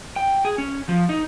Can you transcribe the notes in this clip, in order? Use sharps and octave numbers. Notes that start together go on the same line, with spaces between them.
G5
G#4
C#4
F3
D#4